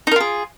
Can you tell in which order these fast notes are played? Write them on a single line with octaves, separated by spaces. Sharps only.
D#4 A#4 F4 G#4